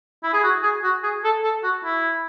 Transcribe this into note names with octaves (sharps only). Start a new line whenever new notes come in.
E4
G#4
F#4
G#4
F#4
G#4
A4
A4
F#4
E4